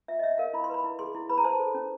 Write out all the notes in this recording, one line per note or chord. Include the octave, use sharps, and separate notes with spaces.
F4 E5
D#5
C#5 E5
A#4 F5
E4 B5
C6
B4 B5
E4
G#4 C6
E4
B4 B5
A#5
C5 A5
A4
C#4